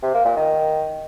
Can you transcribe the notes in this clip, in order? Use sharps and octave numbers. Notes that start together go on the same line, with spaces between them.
C3
A#3
A#2
D#3